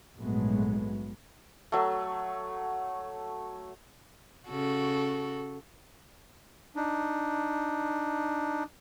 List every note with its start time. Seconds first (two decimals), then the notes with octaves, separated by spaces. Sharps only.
0.16 A#1 G#2 F#3 G#3 A3 B3
1.72 F#3 A3
4.48 C#3 F#4 A4
6.76 D4 D#4